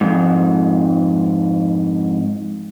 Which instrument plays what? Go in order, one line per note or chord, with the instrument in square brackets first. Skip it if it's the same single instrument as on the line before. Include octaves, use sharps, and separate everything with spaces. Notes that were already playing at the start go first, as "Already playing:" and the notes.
[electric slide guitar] F2 G#2